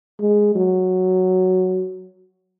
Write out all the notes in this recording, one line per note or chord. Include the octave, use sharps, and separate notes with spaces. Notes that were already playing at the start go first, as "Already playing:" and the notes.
G#3
F#3